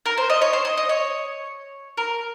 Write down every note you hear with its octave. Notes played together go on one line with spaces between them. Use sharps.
A#4
C5
D#5
C#5
C5
D#5
D#5
C#5
A#4